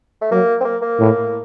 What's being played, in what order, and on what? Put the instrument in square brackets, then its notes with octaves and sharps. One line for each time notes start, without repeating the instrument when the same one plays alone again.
[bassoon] A3
[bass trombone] F#3 [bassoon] A#3
[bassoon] C4
A#3
A#3
[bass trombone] A2